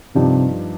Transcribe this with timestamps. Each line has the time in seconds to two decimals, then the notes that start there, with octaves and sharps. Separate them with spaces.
0.15 G2 C3 F3 D#4 G4